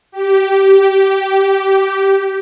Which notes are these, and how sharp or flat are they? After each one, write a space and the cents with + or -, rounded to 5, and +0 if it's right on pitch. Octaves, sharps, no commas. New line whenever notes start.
G4 -15